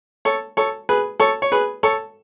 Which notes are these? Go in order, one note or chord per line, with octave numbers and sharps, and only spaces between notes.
A4 C#5
A4 C#5
G#4 B4
A4 C#5
C#5
G#4 B4
A4 C#5